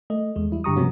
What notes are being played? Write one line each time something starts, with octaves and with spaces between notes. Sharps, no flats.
A3 D#5
E2 G#3
G3 E4
G2 D3 G4 A#5 C#6 D#6
C3 F3 A#3 B3 C#4 F#4